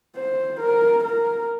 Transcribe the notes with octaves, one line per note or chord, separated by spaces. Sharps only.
C5
A#4
A#4